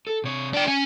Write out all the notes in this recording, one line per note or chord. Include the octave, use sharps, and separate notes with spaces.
A4
C3 C#5
D3 D5 G5
C#4 G#5